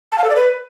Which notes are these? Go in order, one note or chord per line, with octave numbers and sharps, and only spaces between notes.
A5
F5
A4
D5
B4